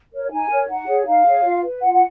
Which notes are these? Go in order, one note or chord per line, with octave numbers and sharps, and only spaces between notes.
A#4 C#5
D#4 G#5
A#4 C#5
D#4 F#5
G#4 C#5
D#4 F5
G#4 C#5
F4
B4
F4 F#5
F#5